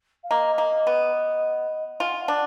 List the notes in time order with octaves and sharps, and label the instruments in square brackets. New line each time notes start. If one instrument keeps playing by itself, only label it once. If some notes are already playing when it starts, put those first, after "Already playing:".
[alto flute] F5
[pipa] A#3 [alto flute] D#5
[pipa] A#3
B3
[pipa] F4 [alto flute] G#5
[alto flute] F#5
F5
F#5
[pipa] D4